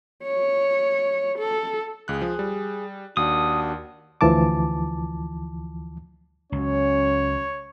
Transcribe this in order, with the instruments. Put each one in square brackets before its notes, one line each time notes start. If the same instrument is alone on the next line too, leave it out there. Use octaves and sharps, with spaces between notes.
[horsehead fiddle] C#5
A4
[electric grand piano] C#2 F#6 [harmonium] G#4
[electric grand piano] F3
G3
[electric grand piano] D#2 [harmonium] D4 F#4 [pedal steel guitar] D#6
[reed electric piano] D2 E3 F3 A5 D6
[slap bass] C#2 [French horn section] F#3 C#4 [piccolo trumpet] C#5